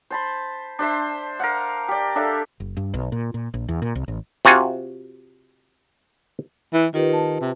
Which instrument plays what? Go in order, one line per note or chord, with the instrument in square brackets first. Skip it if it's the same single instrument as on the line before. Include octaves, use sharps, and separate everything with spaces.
[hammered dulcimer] C5 A5 B5
D4 C5 E5
A#4 F5 F#5
G4 D5
D4 A4 E5 F5
[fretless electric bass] F#1
G2
B1
A#2
A#2
A#1
E2
A#2
C2
A1
[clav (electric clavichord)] C3 F4 F#4 G#5
[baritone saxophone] E3
[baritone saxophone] D#3 [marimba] F4 G4 B4
[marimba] A5
[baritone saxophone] C3